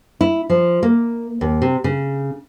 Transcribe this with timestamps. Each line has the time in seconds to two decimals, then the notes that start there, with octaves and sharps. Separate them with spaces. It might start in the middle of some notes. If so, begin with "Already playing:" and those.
0.21 E4
0.50 F3
0.83 A#3
1.41 D#2
1.62 C3
1.84 C#3